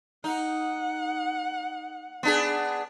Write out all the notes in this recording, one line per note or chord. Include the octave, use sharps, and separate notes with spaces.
D#4 F#5
B3 D4 G#4